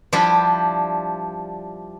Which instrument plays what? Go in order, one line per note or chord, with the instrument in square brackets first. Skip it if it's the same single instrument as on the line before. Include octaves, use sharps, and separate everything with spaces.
[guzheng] F3 G3 D4 E4 G4